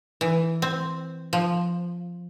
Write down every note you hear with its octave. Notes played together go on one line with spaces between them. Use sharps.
E3
C4
F3